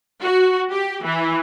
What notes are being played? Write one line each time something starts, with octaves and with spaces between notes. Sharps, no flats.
F#4
G4
E3